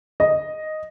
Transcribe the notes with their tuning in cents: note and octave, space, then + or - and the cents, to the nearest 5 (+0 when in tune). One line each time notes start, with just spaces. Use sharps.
D#5 +0